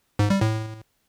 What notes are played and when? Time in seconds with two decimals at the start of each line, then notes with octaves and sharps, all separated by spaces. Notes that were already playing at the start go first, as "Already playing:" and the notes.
0.19 G#2
0.30 G3
0.41 A2